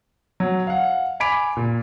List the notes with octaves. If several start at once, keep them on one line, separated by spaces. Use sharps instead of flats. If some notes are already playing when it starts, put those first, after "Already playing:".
F#3
F5 F#5
G#5 B5 D6 B6 D7 F7
A#2